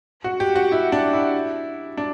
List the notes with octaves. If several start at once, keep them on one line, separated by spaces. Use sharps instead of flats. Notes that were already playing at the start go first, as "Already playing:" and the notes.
F#4
G4
F#4
E4
D4
E4
D4